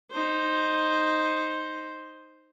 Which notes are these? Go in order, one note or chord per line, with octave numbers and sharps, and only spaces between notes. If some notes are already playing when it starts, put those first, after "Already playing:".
D#4 C5